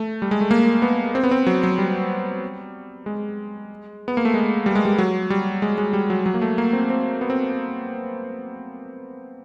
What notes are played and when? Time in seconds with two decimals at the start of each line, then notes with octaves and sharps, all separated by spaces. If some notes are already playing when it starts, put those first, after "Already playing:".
Already playing: A3
0.22 G3
0.31 G#3
0.41 A3
0.51 A#3
0.82 B3
1.15 C4
1.24 B3
1.31 C4
1.47 F#3
1.63 F#3
1.78 G3
3.06 G#3
4.08 B3
4.17 A#3
4.25 A3
4.34 G#3
4.66 G3
4.75 G#3
4.85 G3
4.98 F#3
5.30 G3
5.62 G#3
5.78 G#3
5.93 G3
6.10 F#3
6.26 F#3
6.34 A#3
6.42 A3
6.58 A#3
6.73 C4
6.90 C4
7.21 B3
7.30 C4